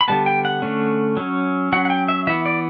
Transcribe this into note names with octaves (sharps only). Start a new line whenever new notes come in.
B5
D3 G3 B3 A5
G5
F#5
D3 A3 C#4
F#3 C#4
F#3 C#4 F#5
F#5
G5
E5
E3 B3 E5
D5